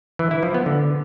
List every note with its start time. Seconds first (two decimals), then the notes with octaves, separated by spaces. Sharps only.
0.19 E3
0.31 E4
0.43 F3
0.54 B3
0.66 D3